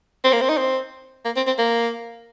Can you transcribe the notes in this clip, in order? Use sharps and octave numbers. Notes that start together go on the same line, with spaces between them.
C4
A#3
C4
D#4
C4
A#3
C4
C4
A#3